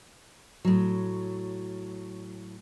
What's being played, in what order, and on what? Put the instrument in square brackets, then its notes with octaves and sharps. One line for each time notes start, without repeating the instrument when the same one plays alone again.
[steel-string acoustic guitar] A2 F#3